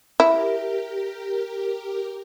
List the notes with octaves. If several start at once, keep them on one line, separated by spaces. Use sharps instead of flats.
E4 G4 A#4